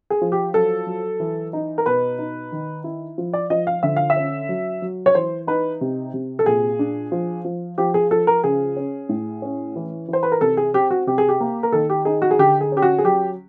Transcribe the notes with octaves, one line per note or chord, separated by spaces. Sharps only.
G#4
F3
G4
F#3 A4
F#3
E3
D#4
A#4
B2 B4
D#4
D#3
E4
F3
D5
F3 D#5
F5
D3 E5
F5
E5
C#4
F#3
F#3
C#5
E3 C5
D#4 B4
C3
C3
A4
A#2 G#4
D4
F3
F3
F3 G4
G#4
F3 A4
A#4
C#3 G#4
C#4
A2
C#4
E3
E3 C5
B4
A#4
C3 A4
G#4
C4 G4
F#4
C3 G4
G#4
G4
A#3
A#4
D#3 A4
G4
D#4 G#4
F#4
G#4
D3 G4
G#4
C#4 G4
F#4
G#4
F#3 G4